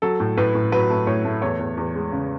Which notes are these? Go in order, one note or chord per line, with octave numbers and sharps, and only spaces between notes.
F#3 A4
A2
A2 B4
A2
F#3 B4
A3
A2 C#5
A3
E2 C#5
E2
E2
G#3
C#3